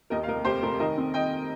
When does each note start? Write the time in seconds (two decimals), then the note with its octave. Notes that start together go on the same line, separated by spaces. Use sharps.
0.10 D#2 A#4 D#5
0.23 F5
0.27 F1 A#4 D#5
0.45 F1 G4 C5
0.63 F1 A#4
0.79 D#3 A#4 D#5
0.98 C4
1.14 D#3 D#5 G5